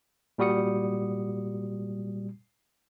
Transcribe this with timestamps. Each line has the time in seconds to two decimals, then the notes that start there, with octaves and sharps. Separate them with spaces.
0.38 A#2 G3 F#4 D#6 C#7